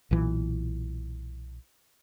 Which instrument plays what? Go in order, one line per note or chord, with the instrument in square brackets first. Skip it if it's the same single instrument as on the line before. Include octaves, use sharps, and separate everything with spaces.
[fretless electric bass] B1 A#2 E3